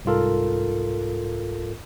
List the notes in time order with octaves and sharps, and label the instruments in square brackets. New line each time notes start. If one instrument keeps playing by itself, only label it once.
[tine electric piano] C2 G#2 F4 A4 A#4